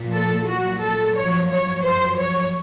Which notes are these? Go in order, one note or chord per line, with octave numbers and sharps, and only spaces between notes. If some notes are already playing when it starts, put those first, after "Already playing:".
Already playing: A#2 F3
A4
A#2 F#3 F#4
A4
F#2 F3 C#5
C#5
F#2 F3 C5
C#5